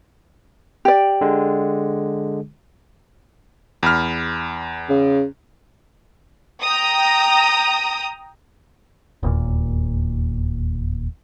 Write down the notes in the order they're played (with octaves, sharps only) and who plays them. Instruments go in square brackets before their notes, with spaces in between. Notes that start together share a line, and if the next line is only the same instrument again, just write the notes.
[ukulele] G4 D5
[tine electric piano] D3 G#3
[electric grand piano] E2 B5 F6
[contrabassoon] C#3
[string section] G5 A#5 D#6
[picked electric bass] E1 D#2 A#2